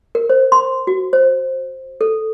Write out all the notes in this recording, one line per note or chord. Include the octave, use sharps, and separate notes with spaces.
A#4
C5
C6
F#4
C5
A4